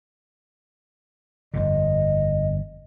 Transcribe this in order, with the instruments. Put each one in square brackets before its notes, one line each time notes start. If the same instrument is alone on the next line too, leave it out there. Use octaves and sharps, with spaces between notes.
[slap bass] G1 F2 D3 [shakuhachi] D#5